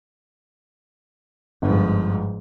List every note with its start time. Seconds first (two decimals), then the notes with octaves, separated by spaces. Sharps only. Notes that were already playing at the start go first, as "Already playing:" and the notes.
1.62 G1 G#2 F3